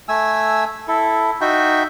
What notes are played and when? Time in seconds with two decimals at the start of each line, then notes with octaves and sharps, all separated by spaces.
0.08 A3 G#5 E6
0.88 E4 A4
1.41 D#4 F#4 E5 G5